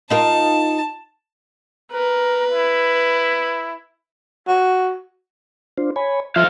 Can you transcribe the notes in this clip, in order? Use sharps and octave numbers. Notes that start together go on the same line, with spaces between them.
D#4 F4 A#4 A5
A#4 B4
E4
F#4
D4 F4 C5
C#5 G#5 B5
F3 C4 F4 E5 F5